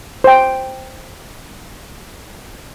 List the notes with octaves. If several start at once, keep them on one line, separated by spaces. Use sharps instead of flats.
C5 G5